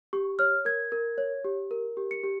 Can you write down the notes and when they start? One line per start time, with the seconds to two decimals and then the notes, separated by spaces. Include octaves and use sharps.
0.13 G4 C#6
0.39 C#5 F6
0.65 A#4 G#6
0.92 A#4
1.18 C#5
1.45 G4
1.71 A#4
1.97 G4
2.11 C#7
2.24 G4